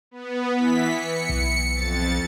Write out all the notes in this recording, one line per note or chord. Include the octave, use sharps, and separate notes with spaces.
B3
E3 B6
C#7
B1
F2 A6